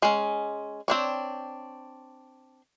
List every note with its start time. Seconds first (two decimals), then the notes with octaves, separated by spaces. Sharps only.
0.02 G#3 C#4
0.88 C4 D4 C#5